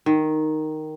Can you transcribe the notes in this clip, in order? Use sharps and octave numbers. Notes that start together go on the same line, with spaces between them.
D#3